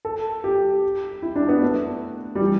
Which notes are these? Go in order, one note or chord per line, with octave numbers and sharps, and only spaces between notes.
A4
G4
E4
D4
B3
A3
G3
E3